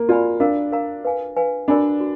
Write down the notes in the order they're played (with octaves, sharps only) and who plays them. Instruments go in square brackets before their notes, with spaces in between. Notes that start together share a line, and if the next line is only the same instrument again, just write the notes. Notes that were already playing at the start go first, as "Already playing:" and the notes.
Already playing: [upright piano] A#3
[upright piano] F4 [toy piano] F#4 D5 G#5 B5
[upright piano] D4 [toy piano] A#4 F5 A#5
[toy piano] A#4 F5 A#5
B4 F5 G#5
B4 F5 G#5
[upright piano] D4 [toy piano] F#4 A#4 D5 G#5 B5
[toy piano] F#4